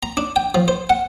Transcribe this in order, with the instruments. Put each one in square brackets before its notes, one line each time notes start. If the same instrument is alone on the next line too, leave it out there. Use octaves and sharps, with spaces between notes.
[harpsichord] A#5
D4
G5
F3
C5
F#5